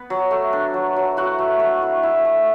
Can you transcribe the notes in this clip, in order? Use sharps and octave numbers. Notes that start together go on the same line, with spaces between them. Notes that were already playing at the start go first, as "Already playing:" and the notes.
Already playing: B3 B4
F#3
A3
D4
F#3
F#3
E4 F#4 F#5
A3
A3
E4
E4
A3